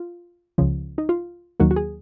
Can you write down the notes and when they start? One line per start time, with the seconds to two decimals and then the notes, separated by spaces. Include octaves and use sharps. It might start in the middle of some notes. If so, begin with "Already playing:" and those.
Already playing: F4
0.58 C#2 C#3 F3
0.98 D#4
1.09 F4
1.60 D#2 D#3 F#3 A#3 F#4
1.71 F#4
1.76 G#4